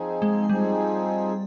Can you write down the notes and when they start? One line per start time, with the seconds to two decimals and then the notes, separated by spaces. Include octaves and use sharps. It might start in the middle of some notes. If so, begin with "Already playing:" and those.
Already playing: F3 C4 D#4 G#4
0.22 G#3
0.49 F3 G3 C4 D#4 G#4